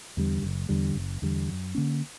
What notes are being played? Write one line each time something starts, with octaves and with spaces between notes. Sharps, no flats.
E2 D3 G3
F#1
E2 D3 G3
F#1
E2 D3 G3
F#2
D3 A#3 C#4